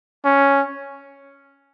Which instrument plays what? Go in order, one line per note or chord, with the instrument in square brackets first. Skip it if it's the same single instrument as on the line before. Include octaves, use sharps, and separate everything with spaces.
[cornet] C#4